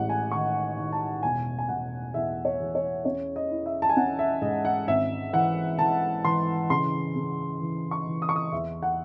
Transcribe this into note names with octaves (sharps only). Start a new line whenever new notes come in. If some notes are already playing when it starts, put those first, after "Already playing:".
Already playing: A1 G#3 F#5
G#5
D#3 C#6
D#3
A5
E1 G#5
G#5
E1 F#5
E2 E5
C#5
E2
C#5
C#4 C#5
D#5
E4
E5
A5
G#5
C#4 F#5
E5
G#2 D#5
F#5
G#1 E5
E3 F#5
E3 A5
E3 C6
C#3 C6
C#3
E3
C#6
E3
D#6
C#6
D#6
E2 E5
F#5